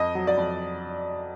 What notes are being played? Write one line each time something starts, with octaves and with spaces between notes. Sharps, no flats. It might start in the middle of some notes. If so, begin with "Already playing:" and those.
Already playing: F2 D#5
F#3
D5
F2